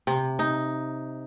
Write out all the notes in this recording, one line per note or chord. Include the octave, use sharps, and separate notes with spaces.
C3
D#4